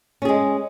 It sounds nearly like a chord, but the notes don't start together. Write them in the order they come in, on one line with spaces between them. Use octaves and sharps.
C#4 G#4 G#3